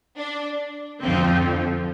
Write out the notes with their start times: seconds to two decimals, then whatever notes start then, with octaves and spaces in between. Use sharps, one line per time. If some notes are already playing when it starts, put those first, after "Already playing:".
0.19 D4
1.02 F2 D3 F3 C4